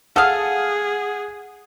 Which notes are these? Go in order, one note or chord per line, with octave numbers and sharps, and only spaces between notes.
G#4 A4 F5 F#5 D#6 F6